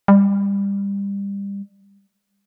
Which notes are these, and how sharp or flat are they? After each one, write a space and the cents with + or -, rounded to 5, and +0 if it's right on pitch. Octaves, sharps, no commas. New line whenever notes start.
G3 +25